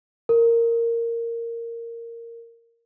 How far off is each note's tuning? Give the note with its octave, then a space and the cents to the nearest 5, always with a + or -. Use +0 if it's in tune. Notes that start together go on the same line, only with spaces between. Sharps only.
A#4 -10